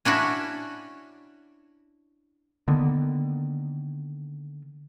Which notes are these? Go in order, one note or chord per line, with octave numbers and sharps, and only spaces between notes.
C#4 D4 E4 F#4
D3 D#3 A#3 B3